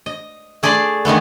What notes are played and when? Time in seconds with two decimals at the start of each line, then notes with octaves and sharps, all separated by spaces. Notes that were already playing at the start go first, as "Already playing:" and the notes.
0.06 D#5
0.63 A3 G#4 D5 B5 C6
1.05 D#3 E3 A3 B3